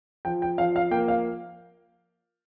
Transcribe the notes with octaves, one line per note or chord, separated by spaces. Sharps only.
F3 G5
G5
F3 F5
F5
A#3 G5
F5